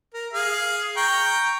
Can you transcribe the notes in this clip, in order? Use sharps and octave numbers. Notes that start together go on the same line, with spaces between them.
A#4
G#4 F5
G5 A#5 C#6